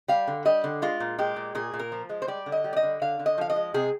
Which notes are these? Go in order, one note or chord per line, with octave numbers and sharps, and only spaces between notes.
G3 F5
D3
G3 D#5
D3
G#3 F4
A#2
G#3 G4
A#2
A#2 G#4
A#2
A#4
F3
G#3
C5
G3 D5
D3
D#5
G3
D5
D#5
D3
D3 F5
D3
D#5
F3 F5
D#5
G#3
C3 G#4